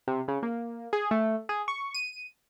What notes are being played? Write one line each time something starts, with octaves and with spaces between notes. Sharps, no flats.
C3
C#3
A#3
G#4
A3
G#4
C#6
D#7